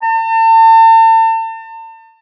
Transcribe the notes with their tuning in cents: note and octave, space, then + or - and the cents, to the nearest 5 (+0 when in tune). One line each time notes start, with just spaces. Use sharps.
A5 +40